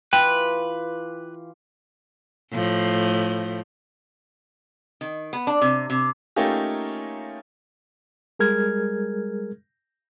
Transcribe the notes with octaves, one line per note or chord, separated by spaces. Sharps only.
E3 F4 G4 B4 G5
A2 F3
D#3
B3
D4
C3
C3
A3 A#3 C#4 D#4 F4 G4
G3 G#3 G#4 A#4 F6 G#6